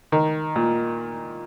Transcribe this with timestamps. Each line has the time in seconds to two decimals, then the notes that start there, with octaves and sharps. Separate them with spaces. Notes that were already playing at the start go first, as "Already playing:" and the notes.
0.12 D#3
0.56 A#2